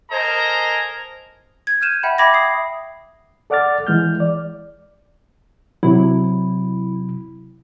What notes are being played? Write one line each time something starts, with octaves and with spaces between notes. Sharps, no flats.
A4 A#4 C5 D#5 G#5 A#5
G#6
F6 G6 D#7 E7
E5 F#5 G5 B5
E5 G5 B5 D6 G#6 A#6
D#6 C7
A4 D5 F#5 D6 F6 A6
E3 G#3 F6 G6
D5
C3 F#3 E4